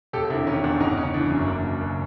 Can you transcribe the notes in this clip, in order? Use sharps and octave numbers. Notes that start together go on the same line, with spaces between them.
E1 G4 A4
C3 D4 E4
D#3 C#4
E2 D4
G1 C#4 D#4
C#3 C#4
E3 D4
F#2 C#4
F#1 D4
B2
F#1